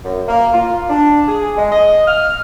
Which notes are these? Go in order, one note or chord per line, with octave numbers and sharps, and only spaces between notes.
F#2
A#3
F4
D4
G#4
G#3
D#5
F6